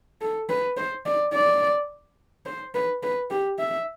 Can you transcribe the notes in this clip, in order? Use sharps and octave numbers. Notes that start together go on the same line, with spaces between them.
A4
B4
C5
D5
D5
C5
B4
B4
G4
E5